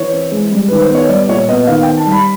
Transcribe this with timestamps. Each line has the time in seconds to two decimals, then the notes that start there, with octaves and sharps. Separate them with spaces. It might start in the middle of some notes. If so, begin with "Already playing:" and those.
Already playing: E3 C#5
0.12 C4
0.32 G#3
0.51 G3
0.68 D#3 B4
0.81 C5
0.89 B3
0.95 C#5
1.09 G3 D5
1.24 D5
1.28 A#2 C#5
1.48 B3 D#5
1.67 D#3 F5
1.83 G5
1.87 C4
1.98 A5
2.07 G3
2.12 B5